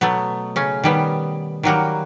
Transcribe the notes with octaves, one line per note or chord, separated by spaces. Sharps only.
B2 F#3 A3 B3
C#3 C#4
D#3 G3 B3
D#3 F#3 G3 A#3 F#4